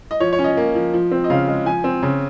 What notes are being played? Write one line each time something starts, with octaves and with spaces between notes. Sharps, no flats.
D#5
F3 C#5
C#5
C#4
D#5
A#3
F3
F3
C4
D#5
C#3 F5
G#3
F3 G#5
C4
C#3